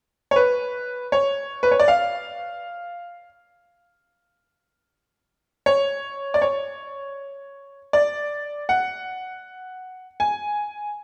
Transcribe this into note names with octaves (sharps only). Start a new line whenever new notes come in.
C#5
B4
C#5
B4
C#5
D5
F5
C#5
D5
C#5
D5
F#5
G#5